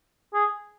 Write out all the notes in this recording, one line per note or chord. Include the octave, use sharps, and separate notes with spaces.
G#4